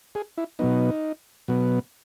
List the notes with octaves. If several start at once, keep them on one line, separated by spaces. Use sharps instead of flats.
G#4
E4
B2 F#3 B3 D#4
B2 F#3 B3